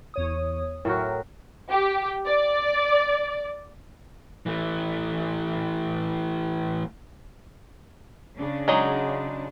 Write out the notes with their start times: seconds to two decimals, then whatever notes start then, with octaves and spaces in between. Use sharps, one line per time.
0.14 E2 C#5 D#6
0.85 A2 F#3 F#4 A#4 G5
1.71 G4
2.26 D5
4.46 E3 A3
8.37 C#3 C#4 D4
8.68 F#3 G#3 D#4